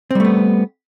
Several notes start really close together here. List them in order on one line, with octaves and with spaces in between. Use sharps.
C4 G3 A3 B3